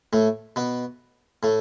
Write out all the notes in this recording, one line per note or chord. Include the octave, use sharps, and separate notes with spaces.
A2 A3
B2 B3
A2 A3